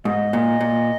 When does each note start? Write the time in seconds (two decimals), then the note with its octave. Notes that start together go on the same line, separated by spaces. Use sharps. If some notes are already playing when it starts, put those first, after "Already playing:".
0.05 G#2 D#5
0.33 A#2
0.61 A#2